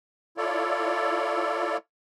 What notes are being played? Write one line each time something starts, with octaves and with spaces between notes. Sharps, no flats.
E4 F4 A4 C#5 D5